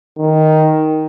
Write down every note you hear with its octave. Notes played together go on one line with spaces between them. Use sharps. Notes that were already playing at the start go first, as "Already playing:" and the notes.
D#3